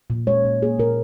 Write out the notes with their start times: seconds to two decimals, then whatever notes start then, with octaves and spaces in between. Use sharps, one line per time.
0.10 A#2
0.27 G#3 C#5
0.45 A#2
0.62 A#3 G#4
0.79 A#2 A#4